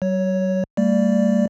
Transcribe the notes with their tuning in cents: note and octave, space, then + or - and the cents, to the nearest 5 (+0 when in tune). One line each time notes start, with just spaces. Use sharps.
F#3 +45 C#5 +5
G3 +10 A#3 -45 D5 +0